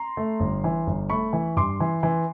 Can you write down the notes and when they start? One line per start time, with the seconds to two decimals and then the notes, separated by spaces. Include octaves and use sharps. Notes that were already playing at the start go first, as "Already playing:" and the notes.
Already playing: A#5 C6
0.17 A3
0.40 G1
0.64 E3
0.87 G1
1.09 A3 B5 C#6
1.33 E3
1.56 G2 C6 D6
1.80 E3
2.03 E3